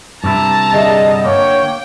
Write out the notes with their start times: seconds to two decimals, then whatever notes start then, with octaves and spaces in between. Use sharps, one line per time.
0.24 G2 C3 E4 A5 A#5
0.72 D3 G#4 D#5 E5
1.25 A#3 C#5 G5